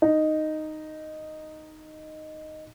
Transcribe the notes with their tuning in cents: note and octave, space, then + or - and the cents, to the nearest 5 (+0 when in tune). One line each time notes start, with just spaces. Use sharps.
D#4 -5